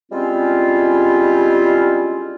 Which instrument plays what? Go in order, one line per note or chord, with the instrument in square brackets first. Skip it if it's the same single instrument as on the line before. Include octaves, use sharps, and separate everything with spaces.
[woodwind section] G3 G#3 C4 C#4 E4 F4